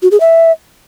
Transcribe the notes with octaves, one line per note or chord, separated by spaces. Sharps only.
F#4
G#4
E5